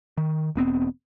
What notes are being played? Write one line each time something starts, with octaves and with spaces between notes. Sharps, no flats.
D#3
E1 B3 C4